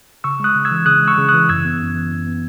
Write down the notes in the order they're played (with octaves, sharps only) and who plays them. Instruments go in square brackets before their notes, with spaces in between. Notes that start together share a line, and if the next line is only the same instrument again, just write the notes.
[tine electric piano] C#3 C#6 E6
G#3 D#6 F#6
C#3
E6 G#6
E3
C#3 D#6 F#6
G#3
C#6 E6
C#3
D#6 F#6
E3
F#2 E6 G#6
B3
F#2
E3
F#2
B3